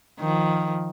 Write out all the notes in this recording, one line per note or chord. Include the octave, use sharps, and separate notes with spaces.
D#3 F3